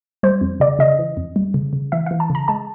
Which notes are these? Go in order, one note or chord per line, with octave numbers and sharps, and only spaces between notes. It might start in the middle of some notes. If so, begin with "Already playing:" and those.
G3 C5
F2
C#3 D5
C#3 D#5
E3
F2
G3
C#3
C#3
E3 E5
E3 F5
A5
C#3 A#5
G#3 A5